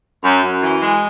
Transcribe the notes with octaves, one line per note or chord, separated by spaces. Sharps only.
F#2
F#2
E3
G#3